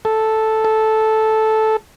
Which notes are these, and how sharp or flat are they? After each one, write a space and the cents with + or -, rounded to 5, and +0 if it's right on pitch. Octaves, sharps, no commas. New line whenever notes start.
A4 -5
A4 -10